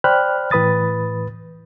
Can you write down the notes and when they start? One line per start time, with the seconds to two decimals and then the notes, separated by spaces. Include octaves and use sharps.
0.04 C5 D5 G5 B5 F6 F#6
0.51 A2 E3 B4 B5 D#6 A6